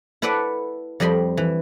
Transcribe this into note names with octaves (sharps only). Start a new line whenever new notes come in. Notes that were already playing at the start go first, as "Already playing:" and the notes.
E4 A4 B4 D5 E5 F#5
F2 G3 D#5 B5 C6
E3